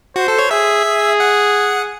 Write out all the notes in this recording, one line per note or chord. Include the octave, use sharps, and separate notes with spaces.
F#4 C5
A4
C#5
G#4 E5
G#4
F#5